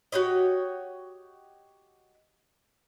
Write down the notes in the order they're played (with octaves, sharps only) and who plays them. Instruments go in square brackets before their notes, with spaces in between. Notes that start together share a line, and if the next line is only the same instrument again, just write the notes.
[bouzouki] F#4 G4 C#5 D#5